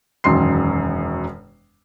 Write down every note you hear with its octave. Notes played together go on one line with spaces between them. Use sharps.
E1 F#2 D#3 C6 C7